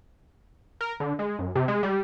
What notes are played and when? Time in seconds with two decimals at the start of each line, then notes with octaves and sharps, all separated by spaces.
0.81 A#4
1.00 D3
1.19 G#3
1.39 F#2
1.55 C3
1.68 G#3
1.83 G3